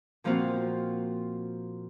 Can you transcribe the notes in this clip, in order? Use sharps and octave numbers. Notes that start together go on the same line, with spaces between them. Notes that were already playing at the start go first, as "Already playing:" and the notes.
A#2 F3 A#3 C4 F4 F#4